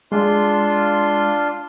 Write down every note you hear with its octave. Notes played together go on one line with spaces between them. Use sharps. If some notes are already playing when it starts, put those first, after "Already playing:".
G#3 D4 F4 C6